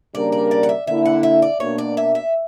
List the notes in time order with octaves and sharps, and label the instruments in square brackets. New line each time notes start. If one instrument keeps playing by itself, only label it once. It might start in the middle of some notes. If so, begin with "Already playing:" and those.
[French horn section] C#3 G3 A#3 D4 A#4 [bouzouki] D5
[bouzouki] D5
D5
F#5
E5
[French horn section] D3 A#3 E4 [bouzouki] E5
[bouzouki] F#5
E5
D5
[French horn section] B2 A#3 D4 [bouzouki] C#5
[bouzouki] D5
E5
E5